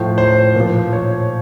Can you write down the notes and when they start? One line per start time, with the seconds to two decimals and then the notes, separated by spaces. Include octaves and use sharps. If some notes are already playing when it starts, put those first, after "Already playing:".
Already playing: A2 F3 C5
0.18 C5
0.55 A#2 F3
0.93 C#5